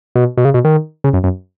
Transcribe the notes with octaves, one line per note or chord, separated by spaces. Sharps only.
B2
B2
C#3
B2
D#3
C#3
F#2
F#2